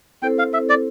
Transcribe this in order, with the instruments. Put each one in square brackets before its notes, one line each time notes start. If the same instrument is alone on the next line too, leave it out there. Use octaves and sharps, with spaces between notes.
[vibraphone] C4 E4 A4 C5 [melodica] G5
[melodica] F5
E5
D5